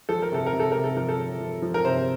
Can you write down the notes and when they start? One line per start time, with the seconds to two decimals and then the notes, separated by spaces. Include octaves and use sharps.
0.09 F3 A4
0.22 A#4
0.32 C3 A4
0.46 A#4
0.53 C3
0.60 A4
0.72 C3 A#4
0.84 A4
0.96 F3 A#4
1.09 A4
1.18 F3
1.40 F3
1.62 F3
1.74 A#4
1.85 C3 C5